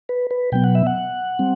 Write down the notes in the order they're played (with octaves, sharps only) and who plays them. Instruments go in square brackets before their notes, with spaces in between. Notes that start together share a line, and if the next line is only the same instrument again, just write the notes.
[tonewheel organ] B4
B4
B2 F#3 B3 G5
F#5
E5
F#5
G3 C4